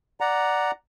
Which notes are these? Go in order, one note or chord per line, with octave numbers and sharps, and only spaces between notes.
D5 F#5 A#5